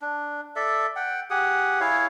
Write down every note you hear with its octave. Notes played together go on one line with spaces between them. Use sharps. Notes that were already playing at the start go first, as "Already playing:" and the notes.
D4
A4 D5 E5
F#5 G5
G4 G#4 F#5 D#6
E4 G#4 C#5 F5